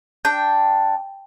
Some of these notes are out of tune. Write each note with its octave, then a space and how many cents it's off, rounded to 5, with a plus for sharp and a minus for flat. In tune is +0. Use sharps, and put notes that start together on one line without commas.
D4 +0 G5 +0